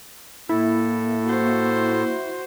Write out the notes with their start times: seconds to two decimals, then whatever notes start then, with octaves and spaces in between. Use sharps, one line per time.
0.49 A2 A#3 E4 A4
1.26 F#4 C5